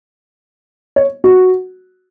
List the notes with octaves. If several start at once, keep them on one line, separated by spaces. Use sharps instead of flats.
C#5
F#4